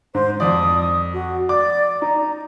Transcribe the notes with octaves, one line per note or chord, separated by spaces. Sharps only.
G#2 C5
F2 D5 D#6
F#4
D5 D6
D#4 A#5